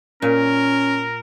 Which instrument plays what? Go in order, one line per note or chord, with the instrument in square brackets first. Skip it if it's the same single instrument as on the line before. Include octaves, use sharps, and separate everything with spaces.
[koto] A#2 [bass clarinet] C#4 [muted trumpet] A#4